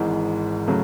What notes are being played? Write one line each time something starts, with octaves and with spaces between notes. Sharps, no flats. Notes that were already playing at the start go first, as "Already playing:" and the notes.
Already playing: G#1 G#2 E3 G#3
C#3 F#3 A3